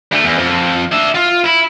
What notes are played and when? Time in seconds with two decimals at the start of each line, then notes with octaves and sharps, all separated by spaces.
0.12 D2 A3
0.24 E2
0.38 F2
0.92 D4 E5
1.14 F4
1.44 E4